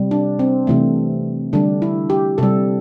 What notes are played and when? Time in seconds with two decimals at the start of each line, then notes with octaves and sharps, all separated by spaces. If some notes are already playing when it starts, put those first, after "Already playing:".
Already playing: C3 G3
0.11 D4
0.39 C4
0.67 C3 E3 A3
1.53 D3 G3 D4
1.82 E4
2.10 G4
2.38 C3 G3 A4